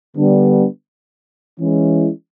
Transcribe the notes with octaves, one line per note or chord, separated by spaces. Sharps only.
D3 G3 B3 D4
E3 G#3 C#4 E4